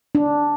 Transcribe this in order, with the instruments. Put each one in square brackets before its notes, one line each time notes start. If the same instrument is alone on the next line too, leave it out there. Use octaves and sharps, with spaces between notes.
[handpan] D4